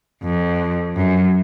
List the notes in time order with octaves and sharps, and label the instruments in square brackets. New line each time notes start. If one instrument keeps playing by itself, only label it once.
[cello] F2
F#2